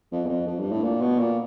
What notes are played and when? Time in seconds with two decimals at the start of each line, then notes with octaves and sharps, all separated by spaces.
0.12 F2
0.25 E2
0.29 F2
0.47 F2
0.59 G2
0.71 A2
0.83 A#2
1.01 B2
1.19 A#2